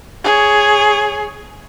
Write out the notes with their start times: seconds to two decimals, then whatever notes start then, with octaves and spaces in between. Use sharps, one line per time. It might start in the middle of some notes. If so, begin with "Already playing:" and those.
0.25 G#4 C#5